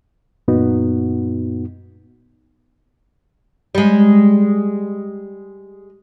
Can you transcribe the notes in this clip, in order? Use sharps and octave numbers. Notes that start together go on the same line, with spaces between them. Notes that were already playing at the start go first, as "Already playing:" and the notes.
F#2 A#2 B3 D#4 F#4
G3 G#3